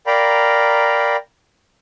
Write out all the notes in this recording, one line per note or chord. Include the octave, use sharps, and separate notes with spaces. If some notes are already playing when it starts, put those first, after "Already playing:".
A#4 D5 F5 G5 A#5 B5